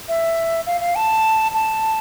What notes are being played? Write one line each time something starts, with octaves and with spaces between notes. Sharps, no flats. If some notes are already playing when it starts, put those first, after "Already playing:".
E5
F5
F5
A5
A5